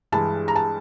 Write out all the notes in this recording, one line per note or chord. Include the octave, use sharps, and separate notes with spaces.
G2 E3 G#3 A5
A#5
A5